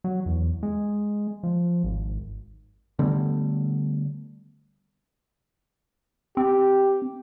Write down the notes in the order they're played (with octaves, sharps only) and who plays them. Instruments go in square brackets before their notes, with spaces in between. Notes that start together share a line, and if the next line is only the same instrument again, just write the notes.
[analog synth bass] F#3
E2
G#3
F3
G#1
[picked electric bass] D3 G3 A3 B3
[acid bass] C4 [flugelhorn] G4